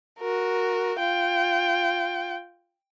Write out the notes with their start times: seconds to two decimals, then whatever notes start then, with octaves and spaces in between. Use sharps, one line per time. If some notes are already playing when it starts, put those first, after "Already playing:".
0.19 F#4 A#4
0.99 F4 G5